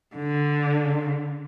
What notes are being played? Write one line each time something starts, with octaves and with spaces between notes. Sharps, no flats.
D3